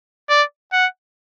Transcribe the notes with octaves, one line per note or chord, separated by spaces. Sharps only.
D5
F#5